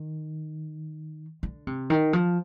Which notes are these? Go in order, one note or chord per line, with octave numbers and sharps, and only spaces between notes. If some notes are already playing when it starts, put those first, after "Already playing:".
Already playing: D#3
D3
C3
D#3
F3